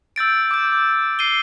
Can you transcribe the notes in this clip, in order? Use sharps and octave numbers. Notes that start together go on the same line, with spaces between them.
E6 G6 A6 D7
D6 G6
C7 D#7 G7